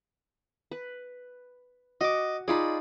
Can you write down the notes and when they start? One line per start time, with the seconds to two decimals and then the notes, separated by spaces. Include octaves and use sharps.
0.71 B4
2.01 F#4 D#5 D6
2.48 D#4 F4 G#4 D5 B5